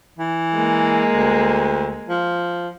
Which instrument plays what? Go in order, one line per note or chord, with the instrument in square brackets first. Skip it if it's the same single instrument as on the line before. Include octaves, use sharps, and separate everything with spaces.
[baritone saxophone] E3
[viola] G#3 A#3
[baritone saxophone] D2
F3